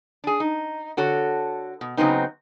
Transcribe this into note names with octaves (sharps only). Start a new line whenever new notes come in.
D4 G#4
D#4
D3 F#4 A4 C#5
B2
C#3 F#3 B3 C4 D#4